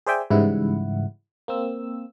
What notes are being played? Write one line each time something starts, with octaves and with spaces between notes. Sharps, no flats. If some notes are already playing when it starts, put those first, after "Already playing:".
G#4 C5 D5 E5 G5 G#5
G#2 C#3 E3 G3 E4 F#5
A#3 C4 E6